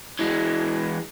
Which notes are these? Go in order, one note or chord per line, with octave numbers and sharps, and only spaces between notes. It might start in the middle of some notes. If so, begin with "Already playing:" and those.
E3 G#3